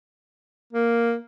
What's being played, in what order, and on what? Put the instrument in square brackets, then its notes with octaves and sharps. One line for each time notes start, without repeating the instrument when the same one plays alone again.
[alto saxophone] A#3